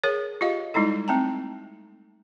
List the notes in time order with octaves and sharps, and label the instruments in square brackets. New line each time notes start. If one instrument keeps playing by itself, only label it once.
[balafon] G#4 A#4 C#5
F4 G4 D#5 F5
G3 G#3 D#4 E4 A4
A3 C4 A5 A#5